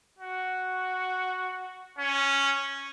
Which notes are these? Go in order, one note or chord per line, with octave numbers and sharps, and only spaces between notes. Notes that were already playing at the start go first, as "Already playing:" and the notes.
F#4
C#4